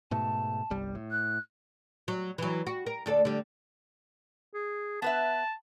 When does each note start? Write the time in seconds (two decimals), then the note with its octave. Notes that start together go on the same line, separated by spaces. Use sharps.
0.11 G#2 B2 A3 A5
0.70 G1 C2 G3
0.95 A2
1.11 F#6
2.08 F#3
2.38 E3 F#3
2.67 F#4
2.86 A#4
3.06 D2 D4 A4
3.25 D3 G3
4.54 G#4
5.02 B3 B4 E5 A5